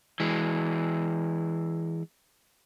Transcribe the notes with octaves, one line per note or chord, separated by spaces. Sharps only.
E3 G#3